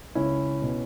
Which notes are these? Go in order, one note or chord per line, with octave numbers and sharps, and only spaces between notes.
C#2 C#4 E4
B2